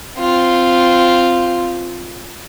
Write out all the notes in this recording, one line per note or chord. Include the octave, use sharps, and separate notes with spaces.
C4 F4